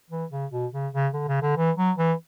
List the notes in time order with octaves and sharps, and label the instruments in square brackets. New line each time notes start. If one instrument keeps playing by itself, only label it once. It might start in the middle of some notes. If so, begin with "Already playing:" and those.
[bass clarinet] E3
C#3
B2
C#3
C#3
D3
C#3
D3
E3
F#3
E3